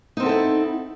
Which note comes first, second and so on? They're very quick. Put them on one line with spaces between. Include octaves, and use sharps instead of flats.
D#4 C4 B3 A4 E4